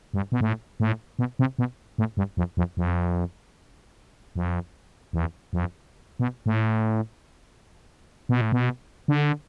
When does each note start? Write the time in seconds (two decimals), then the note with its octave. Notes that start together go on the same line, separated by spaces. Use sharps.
0.14 G2
0.32 B2
0.41 A2
0.80 A2
1.19 B2
1.39 C3
1.59 B2
1.98 A2
2.17 G2
2.37 F2
2.57 F2
2.77 F2
4.36 F2
5.13 E2
5.53 F2
6.19 B2
6.46 A2
8.29 B2
8.41 A2
8.52 B2
9.08 D3